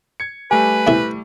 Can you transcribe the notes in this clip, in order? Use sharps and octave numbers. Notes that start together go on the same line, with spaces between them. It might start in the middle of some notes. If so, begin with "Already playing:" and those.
G#6 C#7
G3 A3 G4 B4 G#5
E2 C3 E4